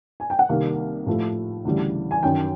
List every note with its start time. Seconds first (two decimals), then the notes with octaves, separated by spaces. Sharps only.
0.20 G#5
0.30 G5
0.39 F#5
0.49 C2 C3 D#3 G3 A#3 F5
1.06 A2 F3 A3
1.65 D2 C#3 E3 G3
2.11 G#5
2.23 F#2 D#3 F#3 G5